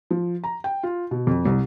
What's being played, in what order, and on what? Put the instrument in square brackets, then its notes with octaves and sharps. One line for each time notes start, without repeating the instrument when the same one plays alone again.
[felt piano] F3
A#5
G5
F4
B2
F2
C2